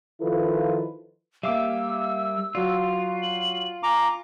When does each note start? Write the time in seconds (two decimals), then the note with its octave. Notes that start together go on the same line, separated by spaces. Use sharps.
0.21 D#3 F3 E4 F4 A4 B4
1.43 G3 A#3 E5 F5 D6 E6
2.55 F#3 F4 F#4 D5
3.22 F#7
3.83 G#5 A#5 D6